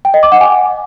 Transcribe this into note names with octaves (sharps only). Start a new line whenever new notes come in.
G5
D#5
D6
F#5
G#5